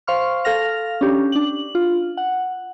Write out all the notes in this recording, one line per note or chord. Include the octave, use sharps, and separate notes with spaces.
C5 F5 C6 C#6 F6
A4 F5 F6 A#6 F7
C#4 D4 G4
D4 F#7
F4
F#5